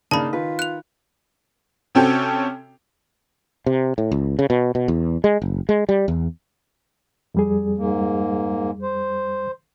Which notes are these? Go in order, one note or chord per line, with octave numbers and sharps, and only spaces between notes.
C#3 A#3 D4 D#4 A5 B5
D#3 F4 B4
F#6 F7
C3 C4 C#4 F#4 A4 G5
C3
A2
C#2
C#3
B2
B2
E2
G#3
F#1
G#3
G3
E2
F2 G3 G#4
G#2 A#3
C5